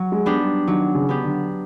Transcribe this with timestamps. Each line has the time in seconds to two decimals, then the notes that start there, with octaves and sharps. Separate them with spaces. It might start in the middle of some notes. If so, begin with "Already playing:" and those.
Already playing: F#3
0.12 G#3
0.26 B3 D4 G4
0.40 G3
0.68 D#3 F#3
0.95 C#3
1.09 B3 D4 G4
1.23 D3